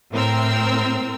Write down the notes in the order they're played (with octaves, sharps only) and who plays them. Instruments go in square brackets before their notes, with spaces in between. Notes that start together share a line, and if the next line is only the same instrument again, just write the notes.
[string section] A2 C4 A#4 E6